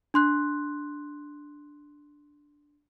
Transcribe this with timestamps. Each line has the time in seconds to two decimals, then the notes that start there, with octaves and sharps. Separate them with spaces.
0.14 D4 C6 F#6